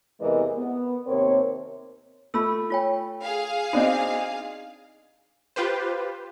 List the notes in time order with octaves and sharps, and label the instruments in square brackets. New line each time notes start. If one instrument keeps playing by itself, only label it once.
[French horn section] E2 C3 E3 G#3 A#4 D#5
B3
D#2 C3 C4 A#4 C#5
[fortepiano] A3 [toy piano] F4 B5 E6
[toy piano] F4 C#5 G5
[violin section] G#4 F5
[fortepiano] C4 D4 D#4 [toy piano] F#4 C5 D5
[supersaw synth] F4 G4 B4 C5